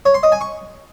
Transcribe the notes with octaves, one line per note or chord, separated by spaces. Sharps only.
C#5
C6
D#5
G#5
C#6